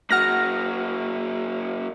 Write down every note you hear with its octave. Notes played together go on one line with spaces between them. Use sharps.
F#3 A#3 F#5 F6 A#6